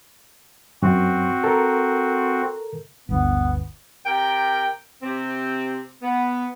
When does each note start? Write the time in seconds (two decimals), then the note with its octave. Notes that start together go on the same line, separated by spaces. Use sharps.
0.82 F#2 C4 F#4
1.44 A4 A#4
3.09 G1 D2 B3
4.06 C3 A#4 G5
5.02 C3 C4
6.02 B3